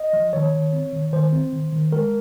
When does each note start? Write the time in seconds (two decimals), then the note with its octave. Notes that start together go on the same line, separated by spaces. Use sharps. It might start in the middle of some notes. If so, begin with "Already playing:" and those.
Already playing: D#5
0.13 F3
0.33 D#3 C#5
0.53 D#3
0.73 C4
0.93 D#3
1.13 D#3 C5
1.32 C4
1.53 D#3
1.72 D#3
1.92 G#3 A#4